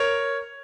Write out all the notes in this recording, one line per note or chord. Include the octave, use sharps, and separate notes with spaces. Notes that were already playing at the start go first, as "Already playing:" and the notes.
Already playing: A#4 C#5